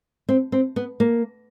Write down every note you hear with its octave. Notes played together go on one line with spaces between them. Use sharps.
C4
C4
B3
A#3